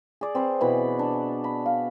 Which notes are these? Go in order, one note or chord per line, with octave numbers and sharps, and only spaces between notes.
G#4 D5
C4 B4
B2 E3 B5
D4
B5
F5